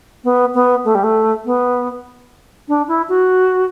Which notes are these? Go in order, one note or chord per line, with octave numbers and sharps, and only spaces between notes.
B3
B3
A3
G3
A3
B3
D4
E4
F#4